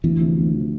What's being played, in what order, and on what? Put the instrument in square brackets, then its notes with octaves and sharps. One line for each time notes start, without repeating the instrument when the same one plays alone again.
[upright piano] D2 [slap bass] E3
[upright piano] C3 F3
D2
C3 F3